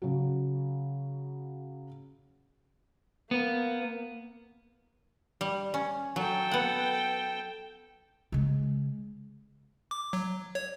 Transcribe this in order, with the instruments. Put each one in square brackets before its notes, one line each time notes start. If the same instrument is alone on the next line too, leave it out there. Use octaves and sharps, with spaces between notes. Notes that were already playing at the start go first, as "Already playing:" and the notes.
[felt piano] C#3 F#3
[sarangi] A#3 [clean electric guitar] B3
[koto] G3
C#4
[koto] F#3 [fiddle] A4 G5
[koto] B3 F#5
[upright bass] C#3 G#3
[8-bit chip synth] D6
F#3
C#5